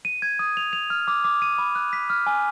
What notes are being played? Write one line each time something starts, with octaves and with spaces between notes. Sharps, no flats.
D#7
G#6
D#6
F7
F7
F6
D6
D6
D#7
B5
F#6
B6
F6
G#5